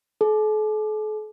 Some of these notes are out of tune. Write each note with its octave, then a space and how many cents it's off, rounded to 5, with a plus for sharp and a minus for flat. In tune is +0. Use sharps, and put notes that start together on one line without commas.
A4 -45